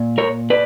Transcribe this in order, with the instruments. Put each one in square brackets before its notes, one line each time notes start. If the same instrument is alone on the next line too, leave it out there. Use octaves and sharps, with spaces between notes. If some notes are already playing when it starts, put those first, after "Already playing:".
Already playing: [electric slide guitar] A#2
A#4 C#5
B4 D5